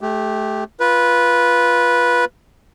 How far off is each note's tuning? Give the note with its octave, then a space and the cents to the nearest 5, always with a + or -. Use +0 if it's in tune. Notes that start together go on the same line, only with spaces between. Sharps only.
A3 -25 G4 +0
F4 -5 B4 -10